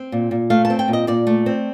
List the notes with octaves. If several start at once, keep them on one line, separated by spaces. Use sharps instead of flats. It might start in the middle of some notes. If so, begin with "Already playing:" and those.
Already playing: C4
A#2
A#2
A3 F5
A5
C4
G5
A#2
D#5
A#2 D5
A3
C4